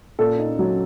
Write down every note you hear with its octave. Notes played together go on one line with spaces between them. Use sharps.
A#2 A4
D#4
F#3